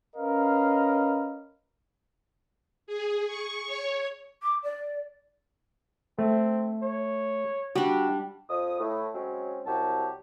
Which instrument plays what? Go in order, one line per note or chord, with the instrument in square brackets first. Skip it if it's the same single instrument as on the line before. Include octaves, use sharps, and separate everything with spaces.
[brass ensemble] C#4 A#4 B4 D#5 F5
[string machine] G#4
C#6
C#5
[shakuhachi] D6
D5
[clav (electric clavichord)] A3 [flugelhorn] C4
[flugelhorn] C#5
[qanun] G3 D4 [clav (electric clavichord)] F#4
[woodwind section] F2 D#6
A2
F#3 G#3 C4 C#4
C2 F#3 G4 A5